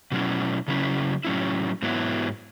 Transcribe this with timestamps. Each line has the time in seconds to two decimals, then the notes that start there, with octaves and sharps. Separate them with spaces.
0.12 B2 F#3 C#4 E4
0.68 C#3 F#3 C#4 E4
1.25 A2 F#3 C#4 E4
1.82 G#2 F#3 B3 E4